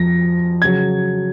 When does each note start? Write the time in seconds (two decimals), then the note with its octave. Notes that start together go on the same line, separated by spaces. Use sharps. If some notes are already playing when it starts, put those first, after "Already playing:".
Already playing: F2 F3 A#6
0.62 C#3 F#3 G#6